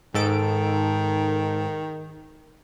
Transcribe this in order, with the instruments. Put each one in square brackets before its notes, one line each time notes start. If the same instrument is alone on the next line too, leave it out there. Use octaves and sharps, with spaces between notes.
[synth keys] G#2 A4 D7 [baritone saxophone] D#3